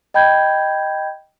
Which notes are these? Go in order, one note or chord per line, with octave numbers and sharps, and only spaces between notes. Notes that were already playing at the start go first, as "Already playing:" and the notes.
D#5 G5 B5 G6 G#6